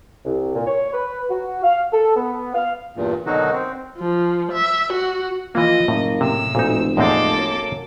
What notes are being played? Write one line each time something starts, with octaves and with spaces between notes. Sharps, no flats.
C2
A#2
C#5
B4
F#4
F5
A4
B3
F5
E2 G2 A#2
B2 D3 D#3 F#3 D#4 F#4
C4
F3
E5
F#4
E3 F3 A#3 F4 D#5
F#1 A2 A#3
A2 C3 E6
F1 D2 A#2 D#4
E2 A2 G#3 A#3 C4 A4 D6
F#2